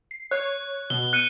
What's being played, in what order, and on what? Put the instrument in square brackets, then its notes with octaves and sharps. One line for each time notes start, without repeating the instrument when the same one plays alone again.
[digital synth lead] C7
[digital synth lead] C#5 [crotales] F#6
[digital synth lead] B2 [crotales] G7
[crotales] F#6 C#7 D#7